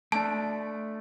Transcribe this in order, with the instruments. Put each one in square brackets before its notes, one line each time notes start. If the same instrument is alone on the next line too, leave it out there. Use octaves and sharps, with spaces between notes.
[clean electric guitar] A3 D4 [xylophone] A5